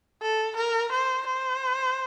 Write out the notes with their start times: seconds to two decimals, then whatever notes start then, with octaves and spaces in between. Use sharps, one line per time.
0.22 A4
0.57 A#4
0.93 C5
1.27 C5